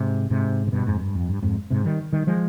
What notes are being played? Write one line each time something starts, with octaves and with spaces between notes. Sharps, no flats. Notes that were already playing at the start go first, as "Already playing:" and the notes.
Already playing: G#2 C3
G#2 C3
C3
G2 B2
F2 G#2
G2
F2
G2
F2 G#2
G#2 C3
D#3 G3
D#3 G3
F3 G#3